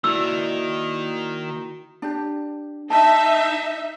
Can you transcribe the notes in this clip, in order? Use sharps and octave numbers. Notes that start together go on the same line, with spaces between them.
D#3 A#3 E4 F#4 D5 E6
D4 G4
D#4 E5 A5